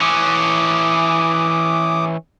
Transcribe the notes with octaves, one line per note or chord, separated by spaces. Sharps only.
E3 C#4 D6 D#6